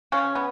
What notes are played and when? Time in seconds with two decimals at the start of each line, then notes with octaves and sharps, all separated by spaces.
0.12 C#3 C#4
0.35 B3